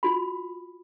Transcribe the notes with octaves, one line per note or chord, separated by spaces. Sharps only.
F4 F#4 B5